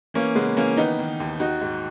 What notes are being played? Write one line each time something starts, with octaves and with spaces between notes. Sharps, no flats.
E3 A#3 C#4
C#3 G#3 B3
E3 A#3 C#4
D#3 B3 D#4
D#3
D#2
D#3 D#4 F#4
G#2